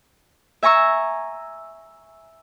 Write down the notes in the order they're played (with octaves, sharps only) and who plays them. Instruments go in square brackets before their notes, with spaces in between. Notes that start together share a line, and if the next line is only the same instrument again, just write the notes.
[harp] E5 G#5 A#5 C#6 E6